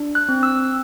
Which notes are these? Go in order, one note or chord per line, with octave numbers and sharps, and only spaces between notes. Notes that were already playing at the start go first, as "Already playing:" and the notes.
Already playing: D4
F#6
C4
E6